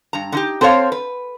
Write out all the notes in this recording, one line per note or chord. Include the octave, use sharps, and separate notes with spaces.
G2 A#5
D3 D#4 G4
C4 A4 C5 C#5 F5
B4